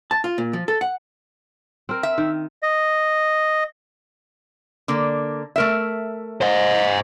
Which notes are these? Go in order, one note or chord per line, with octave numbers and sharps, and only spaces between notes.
A5
F4
A#2
F3
A4
F#5
C4 A#4
E5
D#3
D#5
D3 A#3
A3 A#4 E5
C5 D#5